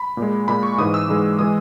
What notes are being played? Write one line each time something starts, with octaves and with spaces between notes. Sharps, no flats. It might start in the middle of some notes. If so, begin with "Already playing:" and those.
Already playing: B5
A#2 G#3
A#2 G#3 B5
C#6
G#2 E3 G#3 D#6
E6
G#2 E3 G#3
E3 G#3 D#6